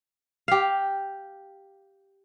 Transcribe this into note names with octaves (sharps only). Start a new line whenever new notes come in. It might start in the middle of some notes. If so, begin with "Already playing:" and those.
G4 F5